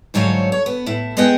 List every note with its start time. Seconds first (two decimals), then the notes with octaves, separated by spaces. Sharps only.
0.14 G#2 D3 F#3 C5 C#5 F5
0.52 C#5
0.66 B3
0.86 A2 E4
1.17 G#3 B3 G#4 D#5 F#5 G5